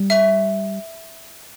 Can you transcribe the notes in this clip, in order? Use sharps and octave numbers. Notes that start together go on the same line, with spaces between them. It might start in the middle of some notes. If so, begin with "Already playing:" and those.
Already playing: G3
E5